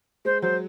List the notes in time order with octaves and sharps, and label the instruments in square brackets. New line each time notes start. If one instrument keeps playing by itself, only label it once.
[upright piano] G#3 [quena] C5
[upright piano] F#3 [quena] C5